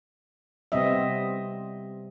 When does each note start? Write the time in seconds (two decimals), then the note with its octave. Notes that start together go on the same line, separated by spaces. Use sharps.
0.72 C3 G3 B3 C4 D#5 E5